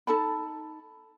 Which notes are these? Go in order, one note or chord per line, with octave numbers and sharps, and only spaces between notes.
D#4 A4 A5 B5